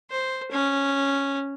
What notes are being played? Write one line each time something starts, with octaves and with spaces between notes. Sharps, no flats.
C5
C#4